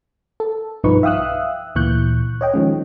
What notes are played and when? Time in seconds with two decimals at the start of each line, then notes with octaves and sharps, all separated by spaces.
0.40 A4
0.83 B1 G2 F3 D#4 B4 C#6
1.03 E5 F5 G5 D#6 E6 F#6
1.75 D2 A#2 E3 C#6 F#6 G6
2.41 C#5 D#5 G5
2.54 D#3 F3 G#3 C#4